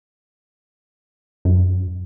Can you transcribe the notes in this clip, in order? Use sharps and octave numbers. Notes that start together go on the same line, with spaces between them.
F#2